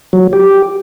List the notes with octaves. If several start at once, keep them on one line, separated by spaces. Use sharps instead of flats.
F#3
G4